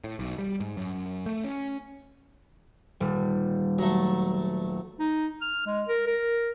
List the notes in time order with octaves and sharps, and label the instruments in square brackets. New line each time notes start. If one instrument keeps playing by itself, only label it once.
[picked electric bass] A2
B1
G3
G#2
F#2
A3
C#4
[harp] D#1 G3
[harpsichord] F#3 A3 [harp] A#5
[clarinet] D#4
F6
G#3
A#4
A#4